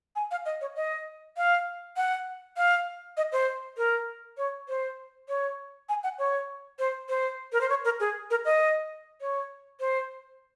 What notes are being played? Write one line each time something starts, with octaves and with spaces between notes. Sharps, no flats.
G#5
F5
D#5
C#5
D#5
F5
F#5
F5
D#5
C5
A#4
C#5
C5
C#5
G#5
F#5
C#5
C5
C5
A#4
C5
C#5
A#4
G#4
A#4
D#5
C#5
C5